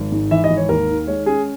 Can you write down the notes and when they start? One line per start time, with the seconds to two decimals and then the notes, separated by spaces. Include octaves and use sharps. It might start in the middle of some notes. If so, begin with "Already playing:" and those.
Already playing: G#1
0.12 G#2
0.31 E3 E5
0.44 D#5
0.50 G#1
0.57 C#5
0.69 D#2 A#4
0.89 D#3
1.07 G#3 C#5
1.26 C#4 G#4